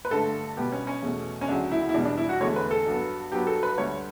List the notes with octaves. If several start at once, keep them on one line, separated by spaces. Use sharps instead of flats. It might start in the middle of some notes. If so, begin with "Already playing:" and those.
B4
G2 D3 A3 A4
B2 G3 B3 G4
C#4
C#4
E2 B2 A3
C#4
D2 C#3 F#3 D4
E4
E4
E2 B2 G3 D4
D4
E4
F#4
E2 D3 A3 C#5
B4
A4
G2 F#3 B3
G2 F#3 B3 G4
A4
B4
D2 D3 G3 B3 C#5